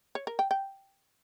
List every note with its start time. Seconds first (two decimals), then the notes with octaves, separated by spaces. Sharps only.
0.15 C#5
0.27 A#4
0.39 G5
0.51 G5